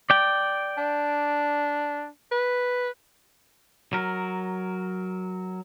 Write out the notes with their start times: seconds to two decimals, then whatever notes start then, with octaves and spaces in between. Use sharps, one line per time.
0.10 D5 G5
0.78 D4
2.32 B4
3.93 F#3 A#4